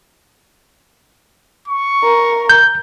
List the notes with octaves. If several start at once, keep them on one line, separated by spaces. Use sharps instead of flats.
C#6
A#4
G6